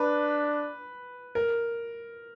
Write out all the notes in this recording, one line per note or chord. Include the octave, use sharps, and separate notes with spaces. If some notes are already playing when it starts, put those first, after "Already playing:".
Already playing: D4 B4
A#4